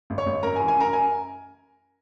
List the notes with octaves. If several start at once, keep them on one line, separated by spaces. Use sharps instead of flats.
G#1
C#5 C#6
G#1
F#2 A#4 A#5
G#5
E3
G#5
F#2 A#4 A#5
G#5